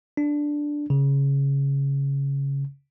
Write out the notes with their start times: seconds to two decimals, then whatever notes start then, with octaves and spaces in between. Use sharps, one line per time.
0.17 D4
0.90 C#3